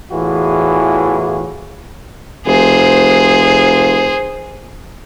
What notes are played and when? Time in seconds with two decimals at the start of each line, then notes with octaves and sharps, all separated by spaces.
0.11 E2 A2 E3 F4 F#4 G#4
2.47 F1 G#4 C5